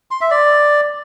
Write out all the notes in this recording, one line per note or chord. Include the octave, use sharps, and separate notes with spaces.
C6
E5
D5